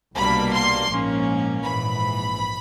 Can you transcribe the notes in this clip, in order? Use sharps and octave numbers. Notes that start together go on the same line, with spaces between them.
C2 B2 G3 A#3 D4 B5
C6
A#1 G#2 F3 A#3 C#4
A#1 G#2 E3 B5